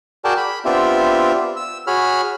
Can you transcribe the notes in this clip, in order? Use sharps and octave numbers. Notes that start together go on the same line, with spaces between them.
F#4 G#4 A#4 D5 G5 A5
B5
B3 C4 D4 F4 G4 E5
E6
F#4 G#4 C#5 B5 F6